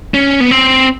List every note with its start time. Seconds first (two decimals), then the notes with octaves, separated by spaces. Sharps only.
0.14 C#4
0.40 B3
0.51 C4